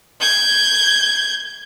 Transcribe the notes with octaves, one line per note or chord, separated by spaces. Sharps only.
G6 G#6